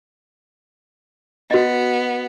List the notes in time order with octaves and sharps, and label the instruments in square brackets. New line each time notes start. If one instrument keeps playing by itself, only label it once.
[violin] B3 [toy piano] F#4 D#5